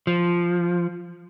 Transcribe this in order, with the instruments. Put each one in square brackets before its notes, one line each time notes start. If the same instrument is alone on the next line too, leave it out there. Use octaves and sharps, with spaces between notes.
[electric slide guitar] F3